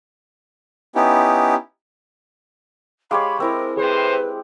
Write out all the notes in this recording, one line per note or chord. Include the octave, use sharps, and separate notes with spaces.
B3 C#4 D#4 E4 G4
G#3 G4 C#5 F5 B5 C6 D6
C4 E4 A#4 E6
A2 C3 G#4 B4 C5